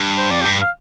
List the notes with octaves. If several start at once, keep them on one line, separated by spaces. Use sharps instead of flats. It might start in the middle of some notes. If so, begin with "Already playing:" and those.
Already playing: G2
C5
F2 D5
G2 G4
F5